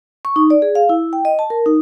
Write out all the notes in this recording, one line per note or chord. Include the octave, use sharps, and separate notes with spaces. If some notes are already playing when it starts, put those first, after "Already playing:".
C#6
D#4
D5
G#4
F5
E4
G5
D#5
A5
A#4
D#4